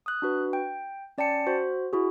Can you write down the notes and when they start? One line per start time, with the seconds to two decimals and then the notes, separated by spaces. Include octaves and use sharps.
0.06 D#6 F#6
0.22 D4 F#4 B4
0.53 G5
1.18 C#4 D5 G5 A5 C#7
1.47 F#4 C5
1.93 E4 F#4 G#4